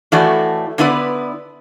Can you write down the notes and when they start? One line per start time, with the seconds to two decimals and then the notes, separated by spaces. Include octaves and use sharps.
0.12 A2 E3 A3 F#4 D5
0.78 D3 B3 E4 B4 D5